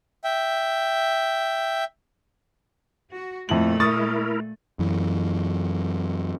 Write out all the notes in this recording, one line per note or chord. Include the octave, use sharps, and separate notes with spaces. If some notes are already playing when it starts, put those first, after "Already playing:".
E5 G5
F#4
F2 A#2 A3 E4 F#7
E4 A#4 C#6 D#6 A6
F#2 E3